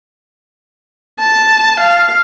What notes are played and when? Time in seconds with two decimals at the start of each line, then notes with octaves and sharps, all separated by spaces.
1.19 A5
1.81 F5